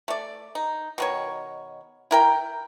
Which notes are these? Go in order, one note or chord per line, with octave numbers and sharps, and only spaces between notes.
A3 D5
D#4
B2 D#3 C#5
E4 A#4 G5